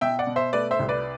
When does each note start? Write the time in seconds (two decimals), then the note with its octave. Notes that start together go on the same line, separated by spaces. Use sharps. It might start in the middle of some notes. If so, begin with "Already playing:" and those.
0.01 B2 E5 G5
0.19 D5 F#5
0.27 B2
0.36 C5 E5
0.53 A3 B4 D5
0.71 C5 E5
0.79 C2
0.89 B4 D5